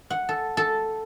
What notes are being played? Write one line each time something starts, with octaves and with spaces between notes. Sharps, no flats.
F#5
A4
A4